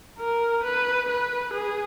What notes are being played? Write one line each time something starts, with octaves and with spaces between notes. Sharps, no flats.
A#4
B4
B4
G#4